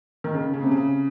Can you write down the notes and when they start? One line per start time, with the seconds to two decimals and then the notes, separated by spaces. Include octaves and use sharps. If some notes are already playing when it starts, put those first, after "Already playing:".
0.24 D#3
0.34 C#3
0.53 C#3
0.63 C3
0.71 C#3